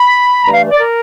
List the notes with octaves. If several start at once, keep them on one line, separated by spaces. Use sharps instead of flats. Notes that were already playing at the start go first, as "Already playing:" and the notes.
Already playing: B5
G2 E3 A3 A#5
F5
D5
A#4